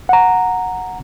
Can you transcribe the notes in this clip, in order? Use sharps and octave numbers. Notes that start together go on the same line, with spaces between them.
F#5 A#5